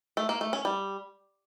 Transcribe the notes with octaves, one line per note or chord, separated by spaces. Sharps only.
A3
A#3
A3
C#4
G3